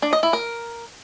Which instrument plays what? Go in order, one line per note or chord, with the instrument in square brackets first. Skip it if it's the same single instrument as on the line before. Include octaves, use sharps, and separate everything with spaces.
[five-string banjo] D4
D#5
E4
A#4